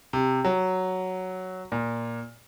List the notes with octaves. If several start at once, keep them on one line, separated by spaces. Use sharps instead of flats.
C3
F#3
A#2